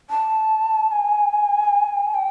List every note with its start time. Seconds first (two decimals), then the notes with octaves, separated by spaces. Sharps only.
0.10 A5
0.92 G#5
2.14 G5